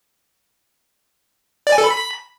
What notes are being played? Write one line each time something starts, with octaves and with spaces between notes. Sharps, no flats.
D5
G#5
A4
B5